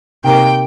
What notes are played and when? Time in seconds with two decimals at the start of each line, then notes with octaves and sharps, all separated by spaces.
0.23 C3 D#3 A#3 G5